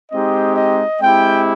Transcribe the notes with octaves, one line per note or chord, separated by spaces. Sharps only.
G#3 C4 D#4 G4 D#5
D#5
G#3 C4 E4 G4 G5